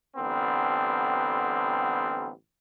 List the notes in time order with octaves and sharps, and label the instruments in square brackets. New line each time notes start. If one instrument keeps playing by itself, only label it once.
[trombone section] A1 D3 G3 B3 C4